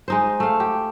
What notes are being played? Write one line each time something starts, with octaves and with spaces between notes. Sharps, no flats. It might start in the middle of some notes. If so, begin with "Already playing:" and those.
G#3 D#4 C5
A3 F5
G4